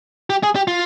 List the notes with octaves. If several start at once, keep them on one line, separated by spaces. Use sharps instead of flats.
G4
G#4
G4
F4